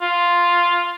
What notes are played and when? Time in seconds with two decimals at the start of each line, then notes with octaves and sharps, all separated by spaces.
0.02 F4